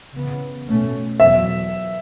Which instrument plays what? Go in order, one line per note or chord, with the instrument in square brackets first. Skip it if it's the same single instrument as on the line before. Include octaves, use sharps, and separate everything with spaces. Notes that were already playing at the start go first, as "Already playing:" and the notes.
[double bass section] C#3 E3 B3
B2 A3 C#4
[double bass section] E2 B2 F#3 [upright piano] E5